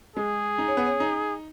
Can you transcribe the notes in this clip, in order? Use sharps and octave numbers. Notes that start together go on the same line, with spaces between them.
G#3 G#4
D#4
C#4
B3
C#4
D#4